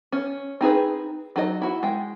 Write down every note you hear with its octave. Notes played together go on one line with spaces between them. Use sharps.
C#4
C4 D#4 G#4 B4
F#3 D#4 A4 D#5
E4 F#4
G#3 G5